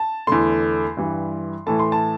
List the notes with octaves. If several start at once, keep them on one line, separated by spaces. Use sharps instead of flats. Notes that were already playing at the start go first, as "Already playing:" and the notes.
Already playing: A5
E2 D3 A3 C6
G2 E3 G3
A2 E3 A3 A5
C6
A5